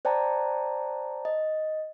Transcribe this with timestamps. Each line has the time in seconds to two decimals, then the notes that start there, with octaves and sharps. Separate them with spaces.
0.05 C5 D5 G5 A5 A#5
1.25 D#5